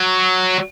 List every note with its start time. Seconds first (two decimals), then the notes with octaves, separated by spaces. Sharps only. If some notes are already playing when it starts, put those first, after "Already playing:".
Already playing: F#3